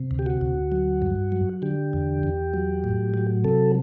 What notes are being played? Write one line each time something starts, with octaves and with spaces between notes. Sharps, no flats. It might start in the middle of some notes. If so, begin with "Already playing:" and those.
Already playing: C3
D2
G4
F#4
D2
F#3
G2
F#3
D3 G4
E2
E2
F#3
A2
F#3
C3 A4